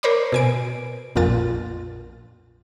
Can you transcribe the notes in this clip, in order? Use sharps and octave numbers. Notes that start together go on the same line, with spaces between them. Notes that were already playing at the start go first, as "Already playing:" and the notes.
A#4 C5 C#5 B5 D6
B2 G#5 D7
A#1 F2 A#2 F4 A6